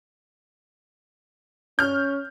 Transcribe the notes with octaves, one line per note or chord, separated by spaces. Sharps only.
C#4 F6 G6